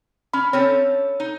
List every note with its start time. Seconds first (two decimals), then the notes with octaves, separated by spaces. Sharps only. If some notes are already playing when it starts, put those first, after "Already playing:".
0.34 C#4 B5
0.53 C4 C#4 A4 C#5
1.20 D#4